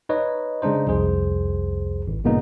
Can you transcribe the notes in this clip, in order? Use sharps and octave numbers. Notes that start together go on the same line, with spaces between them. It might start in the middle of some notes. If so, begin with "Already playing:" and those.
D#4 B4 C#5 D#5
C#3 G#3 D4 D#4 C5
C2 F2 G#4 C5
G#1
G2 A#2 C#3 A#3 B3 D#4